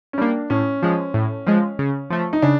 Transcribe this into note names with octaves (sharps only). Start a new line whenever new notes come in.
C#4
G3 A#3 D4
A2 C#4
F3 G#3
A2
F3 G#3
C#3
F3 A3
D#4
C#3 D4